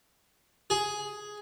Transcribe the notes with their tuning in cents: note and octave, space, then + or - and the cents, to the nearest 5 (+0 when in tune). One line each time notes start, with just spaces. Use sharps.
G#4 +5